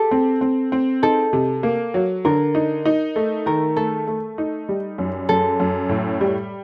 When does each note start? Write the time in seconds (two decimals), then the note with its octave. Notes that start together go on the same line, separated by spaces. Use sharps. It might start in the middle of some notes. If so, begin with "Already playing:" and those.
Already playing: G4 A4
0.11 C4
0.41 C4
0.72 C4
1.02 D#4 A4
1.33 C3
1.63 A#3
1.94 F#3
2.25 D3 A#4
2.55 D#4
2.86 D#4
3.16 A3
3.46 D#3 A#4
3.76 A3 A4
4.07 A3
4.38 D#4
4.69 G3
4.98 F#2
5.29 F#2 A4
5.60 F#2
5.89 A2
6.21 G3